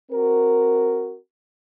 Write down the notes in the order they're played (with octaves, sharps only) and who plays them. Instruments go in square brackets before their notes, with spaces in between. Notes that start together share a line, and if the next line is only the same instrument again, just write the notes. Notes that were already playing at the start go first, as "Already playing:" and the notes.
[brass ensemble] C4 F#4 A#4